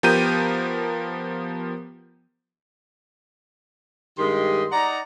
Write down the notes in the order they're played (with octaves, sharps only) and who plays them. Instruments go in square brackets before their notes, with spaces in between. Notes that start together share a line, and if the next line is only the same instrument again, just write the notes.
[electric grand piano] F3 B3 G4 A#4 G6 D#7
[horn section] G2 D#3 G#3 G4 D#5 C6
D#4 D5 F#5 A#5